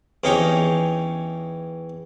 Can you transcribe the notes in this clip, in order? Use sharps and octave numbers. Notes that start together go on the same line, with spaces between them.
E2 C#4 D#4 G4 C#6